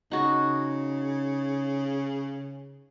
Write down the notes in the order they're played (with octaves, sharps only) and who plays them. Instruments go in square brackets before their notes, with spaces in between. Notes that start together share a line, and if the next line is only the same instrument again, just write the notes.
[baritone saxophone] C#3 [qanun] D#4 F#4